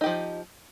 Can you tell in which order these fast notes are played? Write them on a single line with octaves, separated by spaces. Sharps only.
D#4 G4 F3